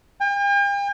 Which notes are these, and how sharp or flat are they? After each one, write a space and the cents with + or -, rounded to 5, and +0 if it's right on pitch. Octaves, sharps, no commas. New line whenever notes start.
G5 +45